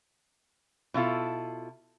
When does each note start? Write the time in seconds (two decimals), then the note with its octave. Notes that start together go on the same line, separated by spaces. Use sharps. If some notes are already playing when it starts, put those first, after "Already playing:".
0.94 B2 E4 F4 A4